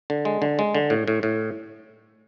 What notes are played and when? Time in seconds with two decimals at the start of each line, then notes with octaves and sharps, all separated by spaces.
0.10 D3
0.25 G#3
0.42 D3
0.59 G#3
0.75 D3
0.90 A2
1.08 A2
1.23 A2